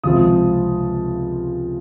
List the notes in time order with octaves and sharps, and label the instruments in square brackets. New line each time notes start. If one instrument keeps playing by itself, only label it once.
[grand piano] C#2 C3 F3 C4 F4 D#6